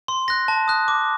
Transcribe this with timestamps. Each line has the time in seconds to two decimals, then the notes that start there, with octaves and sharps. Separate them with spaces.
0.08 C6
0.28 F#6 A#6
0.48 A5
0.68 D#6 F#6
0.88 D6